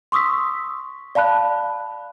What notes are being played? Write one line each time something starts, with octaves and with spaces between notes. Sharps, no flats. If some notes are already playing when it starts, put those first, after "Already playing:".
C6 C#6 D#6 E6 B6
D5 F5 A5 B5 F#6